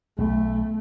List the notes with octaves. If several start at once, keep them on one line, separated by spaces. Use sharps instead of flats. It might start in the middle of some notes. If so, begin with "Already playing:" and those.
B1 A3